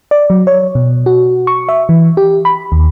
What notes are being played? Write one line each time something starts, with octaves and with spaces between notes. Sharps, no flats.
D5
F#3
C#5
B2
F#4
C#6
E5
E3
G4
B5
D#2